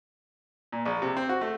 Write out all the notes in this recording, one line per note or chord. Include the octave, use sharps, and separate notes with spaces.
A#2
A#1
C3
C4
F#4
A3